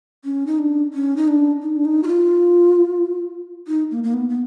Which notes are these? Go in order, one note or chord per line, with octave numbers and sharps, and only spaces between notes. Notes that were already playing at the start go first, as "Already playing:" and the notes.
C#4
D#4
D4
C#4
D#4
D4
D#4
D4
D#4
F#4
F4
D#4
A#3
A#3
B3
B3